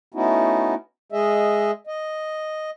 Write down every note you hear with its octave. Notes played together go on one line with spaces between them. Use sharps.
A3 B3 C#4 D#4 E4 F#4
G#3 G#4 D#5 E5
D#5